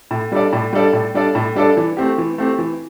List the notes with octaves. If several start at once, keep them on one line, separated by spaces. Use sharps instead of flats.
A2
G3 D4 A4 D5
A2
G3 D4 A4 D5
A2
G3 D4 A4 D5
A2
G3 D4 A4 D5
E3
A3 C4 G4
E3
A3 C4 G4
E3